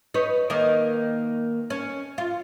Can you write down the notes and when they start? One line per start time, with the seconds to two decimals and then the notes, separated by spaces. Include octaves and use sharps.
0.14 D#4 B4 C#5
0.50 D#3 A#3 D#4
1.70 C#4
2.18 F4